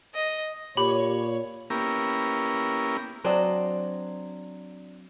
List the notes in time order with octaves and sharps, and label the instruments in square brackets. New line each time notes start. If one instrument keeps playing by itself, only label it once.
[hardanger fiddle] D#5
[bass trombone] A#2 [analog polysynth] G4 [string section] C#5 [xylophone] B5
[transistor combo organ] A#3 B3 C#4 E4 G4 A#4
[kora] F#3 C4 D4 D#5